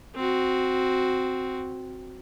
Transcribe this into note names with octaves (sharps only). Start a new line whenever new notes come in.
C4 F#4